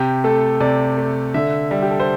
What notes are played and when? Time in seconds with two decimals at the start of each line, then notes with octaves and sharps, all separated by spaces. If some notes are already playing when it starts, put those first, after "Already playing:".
Already playing: C3 G4
0.24 A3 A4
0.60 C3 D5
0.97 A3
1.34 D3 E5
1.71 G3 E5
1.82 G4
1.91 A4
2.00 C5